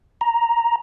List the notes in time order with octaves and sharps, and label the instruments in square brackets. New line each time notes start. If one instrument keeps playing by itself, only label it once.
[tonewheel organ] A#5